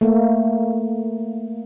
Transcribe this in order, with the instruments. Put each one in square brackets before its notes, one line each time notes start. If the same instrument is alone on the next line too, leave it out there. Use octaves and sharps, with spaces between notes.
[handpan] A3 A#3